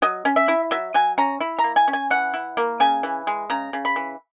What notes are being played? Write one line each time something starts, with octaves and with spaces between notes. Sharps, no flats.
F#3 D#5
C#4
E5
E4
F#3 E5
F#3 G#5
C#4 A#5
E4
A#5
A#3
G#5
C#4
G#5
E3 F#5
E4
A#3
C#3 G#5
E3
G#3
C#3 A#5
C#3
B5
E3